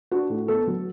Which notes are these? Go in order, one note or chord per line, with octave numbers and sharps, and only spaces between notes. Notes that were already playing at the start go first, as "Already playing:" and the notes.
D4 F#4
A2
B3 A4
F#3